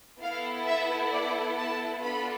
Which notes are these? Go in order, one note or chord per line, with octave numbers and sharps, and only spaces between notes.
B3 E4 A4 F5
E5
D5
A5
B3 D4 F4 A4 B5